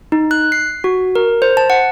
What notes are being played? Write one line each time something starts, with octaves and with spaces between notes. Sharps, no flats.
D#4
F#6
C7
F#4
A#4
C5
A5
F#5